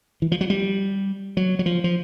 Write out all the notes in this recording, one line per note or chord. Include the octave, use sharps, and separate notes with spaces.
E3
F3
F#3
G3
F#3
F#3
F3
F3